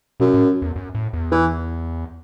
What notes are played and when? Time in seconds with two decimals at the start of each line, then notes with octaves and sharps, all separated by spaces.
0.20 F#2 B2
0.34 A2
0.62 E2
0.76 F#2
0.95 A2
1.13 E2
1.31 E3